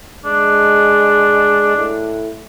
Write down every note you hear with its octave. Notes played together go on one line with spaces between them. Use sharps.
G#3 D4
A2